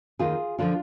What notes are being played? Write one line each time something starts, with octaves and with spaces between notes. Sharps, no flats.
D#2 D#3 F4 G#4
D3 F3 D4 F4